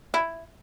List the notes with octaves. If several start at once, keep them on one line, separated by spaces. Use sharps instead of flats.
E4